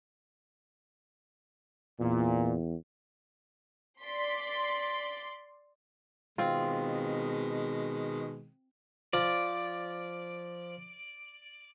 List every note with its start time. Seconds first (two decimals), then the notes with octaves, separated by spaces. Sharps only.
2.00 E2 A#2
4.04 D5 C6 B6
6.38 B2 D#3 G#3 C4 F4
9.13 F3 D5